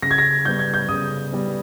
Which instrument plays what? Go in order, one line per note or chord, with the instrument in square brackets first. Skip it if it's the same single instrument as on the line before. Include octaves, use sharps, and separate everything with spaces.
[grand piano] C#3 A#6
G#6
A#6
G3 B3 G6
G#6
G6
C#3 D#6
G3 B3